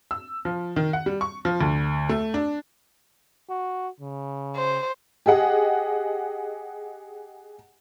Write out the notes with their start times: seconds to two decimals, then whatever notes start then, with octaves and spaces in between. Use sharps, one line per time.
0.11 E6
0.45 F3
0.76 D#3
0.93 F#5
1.06 G3
1.21 C#6
1.45 F3
1.61 D2
2.09 A3
2.34 D4
3.50 F#4
4.01 C#3
4.56 C5
5.26 G4 G#4 D#5 F#5